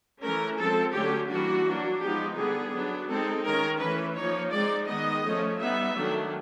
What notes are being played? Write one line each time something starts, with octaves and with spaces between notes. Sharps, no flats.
E3 A3 C#4 A#4
F3 G#3 C4 A4
D3 F#3 A3 C#4 G4
E3 G3 A#3 D4 F#4
F#3 A#3 D4
F3 G#3 B3 D#4 G4
D3 G3 B3 G#4
F#3 B3 D4
G#3 C4 D#4 A4
D#3 G#3 C#4 A#4
E3 A3 C#4 B4
F3 A#3 D#4 C#5
G#3 C4 D#4 D5
D#3 G#3 B3 D#5
F3 A3 C#4
G3 B3 D#4 E5
D#3 F#3 A3 D4